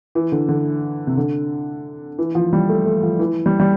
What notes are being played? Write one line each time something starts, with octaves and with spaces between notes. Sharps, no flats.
E3
D3
D3
C3
D3
E3
F3
G3
A3
A3
F3
E3
G3
G3